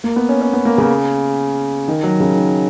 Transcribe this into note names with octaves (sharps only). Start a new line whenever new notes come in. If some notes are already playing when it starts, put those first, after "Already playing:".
A#3
B3
C#4
C#4
B3
A#3
C#3
D#3
F#3
C#3
D#3